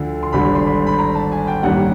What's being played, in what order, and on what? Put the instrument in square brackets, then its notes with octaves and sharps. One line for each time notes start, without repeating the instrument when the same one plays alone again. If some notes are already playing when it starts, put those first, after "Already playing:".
Already playing: [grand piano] D2 D3 F3
C6
G#1 G2 D3 B5
C6
B5
B5
A#5
A5
G#5
G5
A1 G2 D#3 G3 A#3 F#5